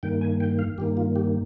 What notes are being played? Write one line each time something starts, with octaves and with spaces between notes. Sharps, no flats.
G2 D#3 A#3 G5
G#5
G5
F5
G2 D#3 A#3 G4
F4
G4